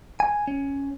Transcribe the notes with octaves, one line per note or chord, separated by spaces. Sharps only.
G#5
C#4